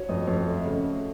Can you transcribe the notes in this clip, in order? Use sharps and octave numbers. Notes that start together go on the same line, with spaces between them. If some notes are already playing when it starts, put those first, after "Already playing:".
Already playing: F#4 C#5
F2 D#5
F2 C#5
A3
C#3
A3